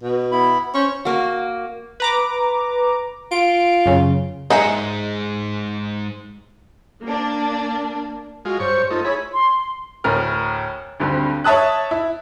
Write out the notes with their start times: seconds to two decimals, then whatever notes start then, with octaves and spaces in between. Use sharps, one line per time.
0.03 B2
0.32 B3 E4 B5
0.74 C#4 C5
1.05 A#3 F#4
2.00 B4 A#5 D6
3.32 F4 D7
3.86 F#2 C#3
4.50 C2 G#2 D#4 G#4 D#5 E5 F#5
7.04 A#3 D4
8.45 G#3 F4 F#4
8.60 G2 C5 C#5 C#6
8.90 A3 D#4 F4
9.05 E4 G#4 C#5 B5
9.33 C6
10.04 D2 A2 A#4 F6
11.00 D2 G2 D3 C4
11.44 C#5 E5 A5 D#6 F#6
11.91 E4